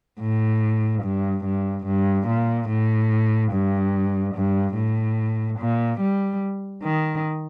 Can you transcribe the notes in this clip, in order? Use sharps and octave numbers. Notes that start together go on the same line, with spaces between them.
A2
G2
G2
G2
A#2
A2
G2
G2
A2
A#2
G3
D#3